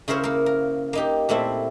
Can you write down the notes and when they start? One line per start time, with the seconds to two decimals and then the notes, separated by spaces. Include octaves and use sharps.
0.08 C#3 E4 A#4 C5 C#5
0.24 A#3 A#4
0.46 A#4
0.93 A#3 D#4 G4
1.29 A#2 A3 C4 E4